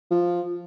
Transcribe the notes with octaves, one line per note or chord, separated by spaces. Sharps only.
F3